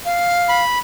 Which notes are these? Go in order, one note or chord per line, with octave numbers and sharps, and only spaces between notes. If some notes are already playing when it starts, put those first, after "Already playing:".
F5
B5